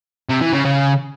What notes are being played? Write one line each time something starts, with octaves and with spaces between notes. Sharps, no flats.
C3
E3
C#3
C#3